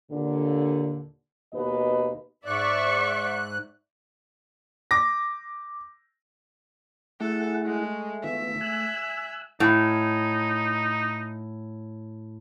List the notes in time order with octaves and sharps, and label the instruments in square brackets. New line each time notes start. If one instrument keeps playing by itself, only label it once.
[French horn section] D#2 A#2 D3
D#2 B2 D#4 B4 D#5
[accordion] G#2 F#6 [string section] D5 E5 C#6
[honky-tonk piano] D6 A#6
[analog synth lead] A3 [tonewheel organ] E4 G#4 F#5 [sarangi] A4
[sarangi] G#3
[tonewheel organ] D#3 B3 F4 [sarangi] E5
[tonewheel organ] G#5 E6 F#6
[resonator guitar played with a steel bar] A2 [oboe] D#4